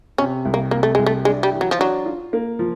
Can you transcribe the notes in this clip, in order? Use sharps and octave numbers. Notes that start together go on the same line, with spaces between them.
C3 C#4
C2
A#3
C3 A#3
A3
C2 G#3
A3
G#3 D4
G3
E3
F#3
F3
F#3 D4
F4
A#3
F3